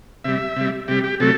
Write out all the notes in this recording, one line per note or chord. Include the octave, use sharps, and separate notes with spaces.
C3 G3 E5
C3 G3
C3 G3 G4
G4
C3 F#3 A3 A4